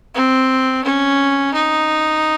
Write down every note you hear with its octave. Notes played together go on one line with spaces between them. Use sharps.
C4
C#4
D#4